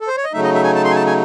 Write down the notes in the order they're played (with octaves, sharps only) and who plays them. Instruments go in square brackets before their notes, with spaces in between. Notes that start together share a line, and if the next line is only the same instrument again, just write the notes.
[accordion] A4
C5
C#5
D#5
C#3 F#3 A3 D#4 E5
D#5
E5
G#5
A5
C6
G#5
A5
G#5